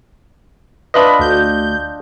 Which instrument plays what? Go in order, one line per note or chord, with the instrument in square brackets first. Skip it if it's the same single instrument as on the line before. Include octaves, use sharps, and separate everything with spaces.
[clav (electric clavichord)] D4 F4 D#5 [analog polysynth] B4 E5 B5
[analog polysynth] D2 G6